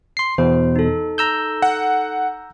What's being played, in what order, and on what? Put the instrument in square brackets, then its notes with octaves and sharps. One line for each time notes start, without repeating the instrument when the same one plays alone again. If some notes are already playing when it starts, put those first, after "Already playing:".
[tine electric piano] C6 C7
[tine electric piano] E2 B2 [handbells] C5
[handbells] D#4 A4
[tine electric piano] A#5 E6 G6
[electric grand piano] F#5